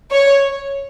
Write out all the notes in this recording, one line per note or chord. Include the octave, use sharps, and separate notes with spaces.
C#5